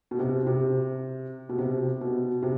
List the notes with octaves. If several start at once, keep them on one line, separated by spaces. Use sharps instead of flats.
B2
C3
C3
B2
C3
B2
C3